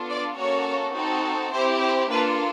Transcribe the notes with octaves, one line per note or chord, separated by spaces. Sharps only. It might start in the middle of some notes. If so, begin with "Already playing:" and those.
Already playing: B3 D4 F4 A4
D5
A#3 C#4 F#4 A4 C#5
C4 D#4 F#4 A4
C4 E4 G4 C5
C5
A#3 D4 F4 A4 B4